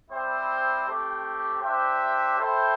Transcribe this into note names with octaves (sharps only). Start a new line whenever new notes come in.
G3 C4 E4 C5 G5
A3 C4 G4
D4 G4 C5 E5 G5
E4 A4 C5 E5 G5